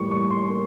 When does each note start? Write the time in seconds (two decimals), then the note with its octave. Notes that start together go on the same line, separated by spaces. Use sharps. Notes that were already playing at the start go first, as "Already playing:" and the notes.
Already playing: A2 E3 G3 A#3 C#6
0.11 C#6
0.31 C6
0.50 A#3